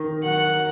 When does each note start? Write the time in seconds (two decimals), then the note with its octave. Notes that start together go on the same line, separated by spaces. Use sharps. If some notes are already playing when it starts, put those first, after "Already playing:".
Already playing: D#3 D#4
0.24 F#3 F#5